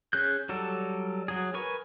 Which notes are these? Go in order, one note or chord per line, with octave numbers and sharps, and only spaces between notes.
C#4 G#4 F#6 G6
F#3 G3 A4
F#3 G#4
A#4 B4 G#5 C#6